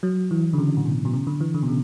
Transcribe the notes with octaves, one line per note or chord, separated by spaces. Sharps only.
F#3
E3
D3
C#3
A2
B2
B2
C#3
D3
E3
D3
B2
C#3